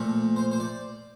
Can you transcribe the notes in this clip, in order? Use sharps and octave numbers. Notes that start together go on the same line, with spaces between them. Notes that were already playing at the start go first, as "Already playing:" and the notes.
Already playing: A#2 F3 A3
C5
C5
D5